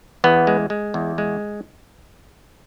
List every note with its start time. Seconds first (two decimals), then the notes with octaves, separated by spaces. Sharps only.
0.24 E2 B3
0.47 G#3
0.70 G#3
0.94 E2
1.18 G#3